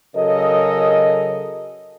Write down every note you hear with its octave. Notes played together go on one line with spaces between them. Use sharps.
C#3 F#3 A4 A#4 D#5